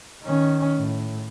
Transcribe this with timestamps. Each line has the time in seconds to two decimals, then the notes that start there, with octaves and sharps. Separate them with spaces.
0.23 D#3 C#4
0.78 A2